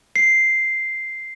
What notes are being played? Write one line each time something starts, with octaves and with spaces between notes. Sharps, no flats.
C7